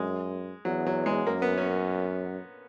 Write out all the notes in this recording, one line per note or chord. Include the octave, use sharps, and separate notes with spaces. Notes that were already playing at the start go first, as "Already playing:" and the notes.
Already playing: F#2 G#3
E2 F#3
F#3
G#3
F#2 A#3
B3
C#4